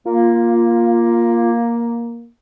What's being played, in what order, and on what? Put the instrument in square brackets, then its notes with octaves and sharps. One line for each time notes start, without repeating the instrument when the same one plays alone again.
[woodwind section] A#3 [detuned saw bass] F4